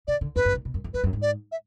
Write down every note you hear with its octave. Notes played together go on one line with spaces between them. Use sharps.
B2 D5
D3
F2 B4
F#2
G#2
A#2
B2
F#2
F2
F#2 B4
F#2
G#2
D5
E5